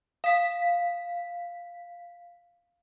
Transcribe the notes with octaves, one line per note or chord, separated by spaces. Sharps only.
F5 B6